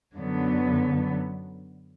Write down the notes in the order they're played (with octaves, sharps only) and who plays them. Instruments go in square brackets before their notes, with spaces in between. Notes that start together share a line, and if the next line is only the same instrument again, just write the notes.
[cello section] F#2 D3 F#3 B3